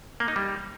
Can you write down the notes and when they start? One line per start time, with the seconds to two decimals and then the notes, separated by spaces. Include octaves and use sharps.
0.20 A#3
0.28 D#4
0.36 G3